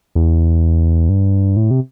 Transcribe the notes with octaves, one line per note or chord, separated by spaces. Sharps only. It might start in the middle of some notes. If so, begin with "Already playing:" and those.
E2
G2
A2
C3